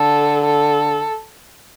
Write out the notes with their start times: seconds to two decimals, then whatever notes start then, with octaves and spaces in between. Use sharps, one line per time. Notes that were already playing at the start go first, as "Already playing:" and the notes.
Already playing: D3 A4
0.44 A4